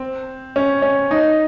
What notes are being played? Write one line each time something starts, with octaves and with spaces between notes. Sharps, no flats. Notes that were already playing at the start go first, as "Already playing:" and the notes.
Already playing: C4
C#4
C#4
D#4